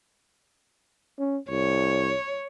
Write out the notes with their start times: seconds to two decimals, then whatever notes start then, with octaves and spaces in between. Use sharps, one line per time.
1.19 C#4
1.50 C2 C#5